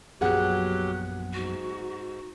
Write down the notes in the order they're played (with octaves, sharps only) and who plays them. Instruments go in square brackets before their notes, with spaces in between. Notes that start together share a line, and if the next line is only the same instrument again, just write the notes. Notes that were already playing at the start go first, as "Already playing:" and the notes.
[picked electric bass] A#1 F#2 B3 [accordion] F#3 G4 [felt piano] G#4 F#5 [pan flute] F#6
[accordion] G#2 [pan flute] F#4